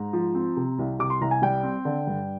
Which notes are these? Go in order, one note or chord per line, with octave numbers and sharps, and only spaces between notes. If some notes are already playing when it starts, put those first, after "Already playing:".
Already playing: G#2 A#5
F3
C4
C3
C2
C3 D6
C6
C2 A#5
G#5
G3 G5
C4
D3
G2